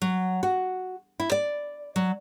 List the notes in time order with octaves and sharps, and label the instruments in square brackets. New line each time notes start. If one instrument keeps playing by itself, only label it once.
[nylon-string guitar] F#3
F#4
E4
D5
F#3